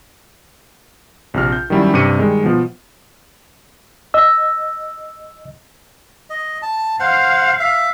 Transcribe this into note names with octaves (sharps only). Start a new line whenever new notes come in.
A#1 C3 F6
G6
D#3 F#3 G3 C#4 E4
G2 C3 D6 C#7 D#7
D#3 G3 G#3
B2 F3
D#5 E6
D#5
A5
C5 F5 F#5
E5 F5